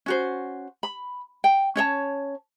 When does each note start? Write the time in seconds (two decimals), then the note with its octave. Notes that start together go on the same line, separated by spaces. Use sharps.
0.06 C#4 F#4 C5
0.83 B5
1.44 G5
1.76 C#4 C#5 D5 A5